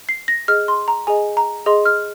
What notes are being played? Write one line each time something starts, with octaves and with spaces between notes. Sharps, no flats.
C7
A#6
G#4 D#5 F6
C6
A#5
G#4 D#5 G#5
A#5
G#4 D#5 C6
F6